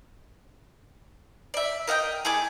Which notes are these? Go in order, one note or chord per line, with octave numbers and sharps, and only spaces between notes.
D5 E5
A#4 D#5 F#5 G5
A3 E4 G#4 D6